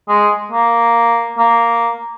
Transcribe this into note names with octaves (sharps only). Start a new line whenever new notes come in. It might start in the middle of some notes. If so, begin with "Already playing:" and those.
G#3
A#3
A#3